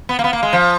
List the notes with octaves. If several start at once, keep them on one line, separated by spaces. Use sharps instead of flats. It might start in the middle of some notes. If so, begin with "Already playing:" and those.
B3
A#3
B3
A#3
G#3
F3